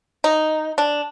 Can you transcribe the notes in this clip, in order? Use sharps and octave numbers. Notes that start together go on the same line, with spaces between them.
D#4
D4